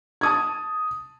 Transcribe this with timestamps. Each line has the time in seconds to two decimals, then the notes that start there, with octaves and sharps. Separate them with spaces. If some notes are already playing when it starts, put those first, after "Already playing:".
0.21 A5 D#6 G#6